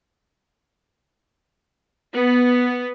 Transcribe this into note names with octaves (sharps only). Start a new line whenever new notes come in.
B3